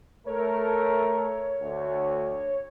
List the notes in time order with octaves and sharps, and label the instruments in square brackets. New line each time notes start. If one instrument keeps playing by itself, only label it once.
[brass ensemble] A3 A4 A#4 [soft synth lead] C#5
[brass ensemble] D2